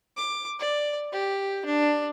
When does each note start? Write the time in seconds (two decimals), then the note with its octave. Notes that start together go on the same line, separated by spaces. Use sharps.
0.17 D6
0.59 D5
1.12 G4
1.65 D4